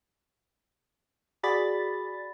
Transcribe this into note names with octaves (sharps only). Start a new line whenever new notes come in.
F#4 G#4 D5 B5 A6